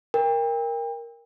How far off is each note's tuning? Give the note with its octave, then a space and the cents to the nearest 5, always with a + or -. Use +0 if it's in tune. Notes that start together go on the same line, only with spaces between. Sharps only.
A#4 +5 G5 +35